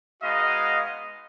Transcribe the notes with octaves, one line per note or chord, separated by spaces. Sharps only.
G#3 B3 D#4 F#4 D#5 F5